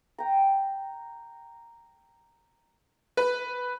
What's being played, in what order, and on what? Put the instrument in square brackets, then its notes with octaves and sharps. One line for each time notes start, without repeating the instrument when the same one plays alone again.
[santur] G5 A#5
[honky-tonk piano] B4